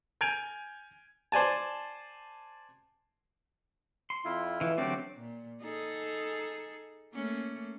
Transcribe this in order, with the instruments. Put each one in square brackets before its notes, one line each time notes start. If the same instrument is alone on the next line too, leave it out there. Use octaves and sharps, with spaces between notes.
[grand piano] G#5 G6 G#6 D7 D#7 F7
[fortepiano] C5 D5 G#5 A5
[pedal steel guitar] C6
[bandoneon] F2 E4 F4
[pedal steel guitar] E3
[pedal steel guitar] D3 F#3 C4 [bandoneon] A3 G4 D5
[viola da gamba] A#2
D#4 G#4 A4
A3 A#3 C#4